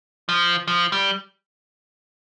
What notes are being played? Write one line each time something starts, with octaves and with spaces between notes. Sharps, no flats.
F3
F3
G3